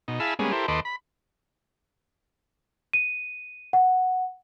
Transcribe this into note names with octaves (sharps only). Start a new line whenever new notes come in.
B2 D#4
E4 G#4 F5 A5 B5 E6
G3 G#3 A#3 B3 C#4 G#4
E4 G4 A4 A#4 C5
D#2 A4 B4 D#5 C6 D6
B5
D#7
F#5